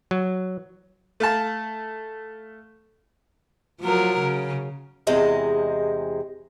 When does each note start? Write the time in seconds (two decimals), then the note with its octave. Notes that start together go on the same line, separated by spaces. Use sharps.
0.11 F#3
1.20 A3 F5 A5
3.82 F3 F#3 A#4
4.20 C#3
5.07 E2 C3 G#3 D#5